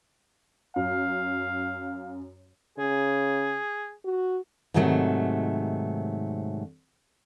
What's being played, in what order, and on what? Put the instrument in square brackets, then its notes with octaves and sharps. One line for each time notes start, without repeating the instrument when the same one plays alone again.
[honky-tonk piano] F#2 [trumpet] F5
[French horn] C#3 [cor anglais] G#4
[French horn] F#4
[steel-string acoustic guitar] G#2 C3 D#3 F#3 G#3 A3